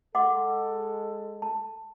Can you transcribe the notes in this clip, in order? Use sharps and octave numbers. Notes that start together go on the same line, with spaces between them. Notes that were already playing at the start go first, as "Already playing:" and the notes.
G#3 A4 F#5 C6 D6
A5